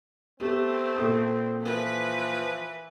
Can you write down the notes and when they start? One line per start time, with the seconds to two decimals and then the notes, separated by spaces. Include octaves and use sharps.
0.40 A3 B3 C4 G4
0.96 A#2 A4 D#6
1.61 E3 F3 B4